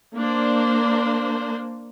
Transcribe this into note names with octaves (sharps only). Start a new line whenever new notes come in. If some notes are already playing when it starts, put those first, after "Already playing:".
A#3 D4 C5